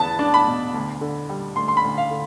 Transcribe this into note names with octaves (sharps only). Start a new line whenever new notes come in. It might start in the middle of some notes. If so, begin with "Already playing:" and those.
Already playing: E2 B3 A5
D4
B5
B2
D2
D3
G3
D2 C6
C6
B5
D2
F5
D3